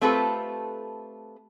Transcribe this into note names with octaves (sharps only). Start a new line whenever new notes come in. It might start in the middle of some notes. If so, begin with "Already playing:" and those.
A3 C4 F4 G4 A4 B4